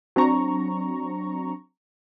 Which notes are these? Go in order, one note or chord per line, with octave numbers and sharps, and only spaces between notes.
F#3 C4 D4 A#5 C#6